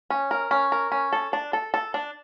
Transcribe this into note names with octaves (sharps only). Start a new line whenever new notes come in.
C#4
A#4
C#4
A#4
C#4
A4
D4
A4
A4
D4